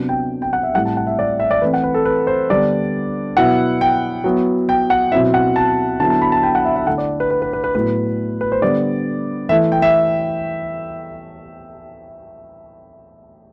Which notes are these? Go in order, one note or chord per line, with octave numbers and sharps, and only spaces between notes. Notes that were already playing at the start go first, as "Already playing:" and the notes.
Already playing: C3 F#3 B3 D4
G5
G5
F#5
E5
A2 G3 C4 E4 F#5
A5
F#5
E5
D5
E5
D5
E3 A3 C4 B4
F#5
B4
A4
B4
C5
D3 G3 B3 D4 D5
B2 F#3 B3 E4 F#5
G5
F#3 B3 E4
G5
F#5
B2 F#3 C4 E4 E5
F#5
A5
D3 F#3 B3 E4 A5
A5
B5
A5
G5
F#5
E5
E5
D3 A3 E4 F#5
D5
B4
B4
B4
B4
B4
A2 F#3 B3 E4 B4
B4
C5
D3 G3 B3 D5
E3 A3 E4 E5
G5
E5